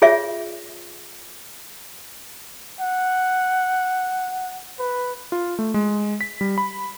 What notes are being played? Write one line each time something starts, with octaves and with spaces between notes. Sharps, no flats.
F4 G#4 C#5 E5
F#5
B4
F4
A3
G#3
B6
G3
B5